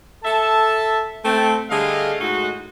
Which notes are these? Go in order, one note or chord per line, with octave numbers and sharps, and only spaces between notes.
A4 E5 A5
A3 C4 A4
D3 G3 A3 G#4 D#5 F5
A2 G#3 D#4 F#4